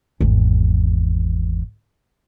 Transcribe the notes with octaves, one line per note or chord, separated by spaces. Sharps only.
G#1 E2